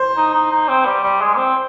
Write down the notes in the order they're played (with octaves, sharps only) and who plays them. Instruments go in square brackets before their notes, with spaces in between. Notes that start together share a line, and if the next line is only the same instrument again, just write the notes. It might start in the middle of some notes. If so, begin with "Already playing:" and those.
Already playing: [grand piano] C5
[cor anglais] D#4
D#4
D#4
C4
G3
G3
G#3
A#3
C4